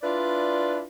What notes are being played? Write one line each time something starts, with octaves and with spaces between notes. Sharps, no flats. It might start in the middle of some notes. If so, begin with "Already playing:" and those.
D4 E4 F4 B4 D5